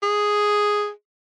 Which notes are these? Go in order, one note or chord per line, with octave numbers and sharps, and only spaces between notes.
G#4